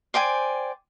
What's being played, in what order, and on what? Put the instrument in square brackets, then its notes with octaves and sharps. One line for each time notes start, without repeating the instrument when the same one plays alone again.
[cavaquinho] C5 D5 G5 G#5